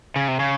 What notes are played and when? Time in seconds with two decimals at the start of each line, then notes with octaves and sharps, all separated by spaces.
0.16 C#3
0.28 C3
0.40 C#3